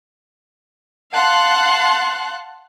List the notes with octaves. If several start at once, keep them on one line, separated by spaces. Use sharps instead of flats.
F5 F#5 A5 C6 F#6